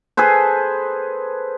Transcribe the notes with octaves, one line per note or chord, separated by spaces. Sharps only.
G#4 A4 B4 C5